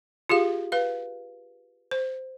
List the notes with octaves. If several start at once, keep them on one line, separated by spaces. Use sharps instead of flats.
F4 G4 G#4 F5
B4 F5
C5